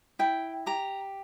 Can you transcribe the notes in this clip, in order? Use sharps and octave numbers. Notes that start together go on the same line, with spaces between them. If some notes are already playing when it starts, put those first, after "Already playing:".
E4 G5
G4 A#5